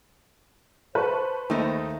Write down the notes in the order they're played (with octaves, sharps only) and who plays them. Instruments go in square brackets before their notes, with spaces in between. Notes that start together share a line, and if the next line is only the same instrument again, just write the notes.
[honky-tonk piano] B4 A5 C#6 [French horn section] C5
[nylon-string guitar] D#2 D#5 [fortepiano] D#3 A3 D#4